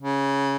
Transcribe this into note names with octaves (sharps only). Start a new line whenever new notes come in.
C#3